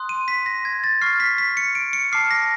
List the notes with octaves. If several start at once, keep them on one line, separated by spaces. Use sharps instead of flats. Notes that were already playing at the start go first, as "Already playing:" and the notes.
Already playing: C6 D#6 F#6
D#7
B6
A#6
G#6
A6
C#6 F6 C7
B6
B6
C#7
D7
C#7
A5 D6 F6 C7
A#6